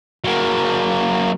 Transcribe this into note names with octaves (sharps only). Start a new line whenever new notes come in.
F#3 A#3